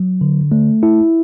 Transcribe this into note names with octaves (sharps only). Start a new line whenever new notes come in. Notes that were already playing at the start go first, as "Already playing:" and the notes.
Already playing: F#3
D3
A3
E4